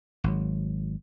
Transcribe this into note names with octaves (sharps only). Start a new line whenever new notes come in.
G#1 F#3